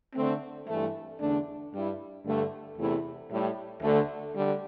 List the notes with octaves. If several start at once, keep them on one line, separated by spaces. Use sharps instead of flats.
D3 A3 C4
G2 E3 A3
E2 D3 A3 D4
G2 G3 E4
G2 D3 A3
E2 C3 A3 E4
A2 G3 E4
D2 D3 A3
D3 G3